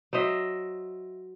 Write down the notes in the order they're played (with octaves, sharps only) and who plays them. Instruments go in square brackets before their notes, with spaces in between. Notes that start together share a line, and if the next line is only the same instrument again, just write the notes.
[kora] F#3 C5 D#5 E5